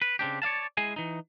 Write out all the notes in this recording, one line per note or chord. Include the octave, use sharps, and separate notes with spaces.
B4
C#3 C4 D4 G4
C#5 D5 F5 A5
G#3 E4 G#4 G#5
E3 D#4